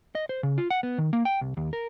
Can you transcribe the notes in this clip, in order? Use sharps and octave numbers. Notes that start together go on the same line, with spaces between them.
D#5
C5
C#3
F4
F#5
B3
D#3
A#3
G5
C2
D#2
A#4